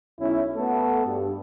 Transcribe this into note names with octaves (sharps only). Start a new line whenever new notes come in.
B1 C#4 E4
A3 B3 F#4 A4
G2